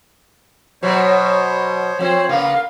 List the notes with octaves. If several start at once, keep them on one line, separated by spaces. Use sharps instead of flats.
B2 F#3 C5 C#5
F3 C4 C5 C#5
C#3 A#3 B3 F5